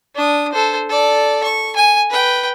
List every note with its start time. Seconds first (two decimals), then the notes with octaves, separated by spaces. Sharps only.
0.15 D4 D#6
0.53 A4 C5
0.89 A4 D5
1.44 C#6
1.76 G#5
2.10 B4 G5